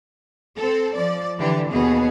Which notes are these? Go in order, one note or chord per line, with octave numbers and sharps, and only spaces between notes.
C4 A4
F3 D5
D3 E3 D4 G4
D#2 B2 B3 G#4